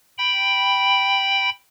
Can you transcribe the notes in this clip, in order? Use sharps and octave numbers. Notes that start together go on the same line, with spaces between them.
G5 B5